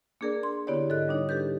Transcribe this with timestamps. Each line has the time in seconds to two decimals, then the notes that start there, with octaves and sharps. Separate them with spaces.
0.21 A#3 D4 G#4 A#4 D5
0.43 C6
0.67 D3 B3 E4 G4 C#5 D5
0.89 G#2 A4 D#5 F#6
1.07 G3 D4 D#4 C#5
1.29 G4 A4 B4 G6